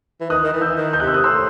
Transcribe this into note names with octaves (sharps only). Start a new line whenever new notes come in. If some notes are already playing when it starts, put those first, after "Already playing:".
E3
D#3 D#6 F#6
D#3
E3
E6 G6
D#3
G6
C3 F#6
E6
D#6 F#6
A2 C6 E6